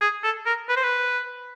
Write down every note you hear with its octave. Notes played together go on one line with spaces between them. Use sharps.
G#4
A4
A#4
B4
C5
B4